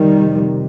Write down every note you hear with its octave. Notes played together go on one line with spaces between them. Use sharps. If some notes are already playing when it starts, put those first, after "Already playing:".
Already playing: F2 C3 D#3 G3